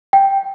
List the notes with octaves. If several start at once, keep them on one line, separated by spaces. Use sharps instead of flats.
G5